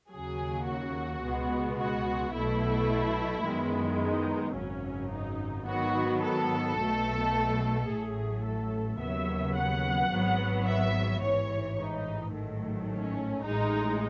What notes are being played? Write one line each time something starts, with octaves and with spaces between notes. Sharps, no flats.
D#2 C#3 F#3 G#4
F#4
C#2 B2 G#3 B3
F#4
B1 B2 A3 E4
F#2 D#3 G#3 B3
D#4
G#1 F#2 C#3 F#3 C#4
D#4
G#2 D#3 F#3 B3 F#4
A4
B1 B2 A3
A1 A2 F#3 A3 G#4
A4
D#2 C#3 F#3 B3 E5
F#5
G#1 G#2 F#3 B3
E5
A1 G#2 E3 C#5
D#4
A1 G#2 D#3 F#3 A3
C#4
A1 A2 G#3 D#4